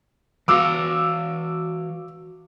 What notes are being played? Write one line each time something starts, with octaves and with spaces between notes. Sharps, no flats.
E3 F#4 F5 D6 E6